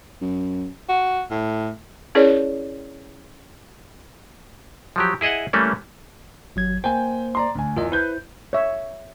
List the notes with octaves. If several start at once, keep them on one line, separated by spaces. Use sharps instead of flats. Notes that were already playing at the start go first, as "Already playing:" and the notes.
F#2
F#4
A2
C#4 E4 G#4 A#4 C#5 D5
F3 F#3 G4
E4 G#4 D#5 E5 F#5
E3 G3 A3 A#3 C#4
G#1 F#3 G#6
A#3 C5 G5 G#5
D5 A#5 C6
D2 G#5
E2 F4 A#4 D#5
E4 B4 C5 G6
C#5 E5